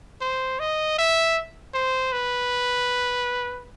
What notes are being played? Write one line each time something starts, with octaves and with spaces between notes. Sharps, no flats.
C5
D#5
E5
C5
B4